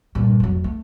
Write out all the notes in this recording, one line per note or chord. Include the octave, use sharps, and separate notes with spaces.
G2 A#2
F1 F#3
A3